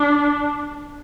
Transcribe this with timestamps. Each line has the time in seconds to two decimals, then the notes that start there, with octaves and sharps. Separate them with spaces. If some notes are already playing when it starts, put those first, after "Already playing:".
Already playing: D4